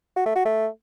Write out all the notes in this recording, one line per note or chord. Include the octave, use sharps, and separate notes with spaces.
F#4
A3
F#4
A3